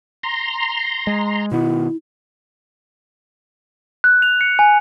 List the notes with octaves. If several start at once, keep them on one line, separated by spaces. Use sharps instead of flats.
A#5 C6
G#3
B2 D#3 B3 E4
F#6
F7
C#7
G#5